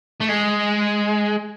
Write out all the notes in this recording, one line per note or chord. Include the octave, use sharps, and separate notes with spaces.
A3
G#3